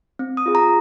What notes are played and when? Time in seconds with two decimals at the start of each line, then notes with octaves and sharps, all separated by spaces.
0.19 C4
0.37 D#6
0.46 F4 G#4
0.55 A#5